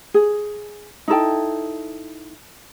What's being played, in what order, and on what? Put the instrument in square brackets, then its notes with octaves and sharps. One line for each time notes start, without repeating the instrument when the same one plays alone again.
[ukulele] G#4
D#4 E4 A4 G5